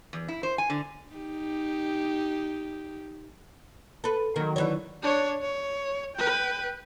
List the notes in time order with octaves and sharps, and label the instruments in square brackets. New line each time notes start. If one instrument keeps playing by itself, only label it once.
[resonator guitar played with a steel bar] E2
E4
C5
G#5
D3
[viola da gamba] D#4 G4
[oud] A4 B4
[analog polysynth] D#3 F#3 [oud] A#3
[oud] D3 E3 C#5
[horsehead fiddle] D4 C#5
C#5
B4 G5